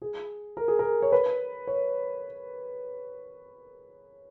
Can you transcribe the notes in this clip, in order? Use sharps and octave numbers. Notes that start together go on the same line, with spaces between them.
G#4
A#4
G#4
A#4
C#5
B4
C#5